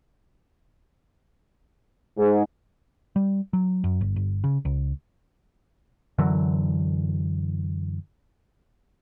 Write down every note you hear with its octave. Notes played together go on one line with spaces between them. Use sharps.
G#2
G3
F#3
F#2
G1
G1
C#3
C#2
F#2 D3 E3 F#3